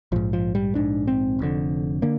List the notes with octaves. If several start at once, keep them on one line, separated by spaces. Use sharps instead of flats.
A#1 G#2 F3
F3
G3
A#1 G#2 D4
C4
F1 F2 D3
D3 A#3